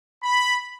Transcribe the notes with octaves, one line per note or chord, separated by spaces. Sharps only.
B5